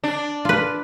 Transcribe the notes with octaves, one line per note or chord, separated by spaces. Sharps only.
D4
F4 B4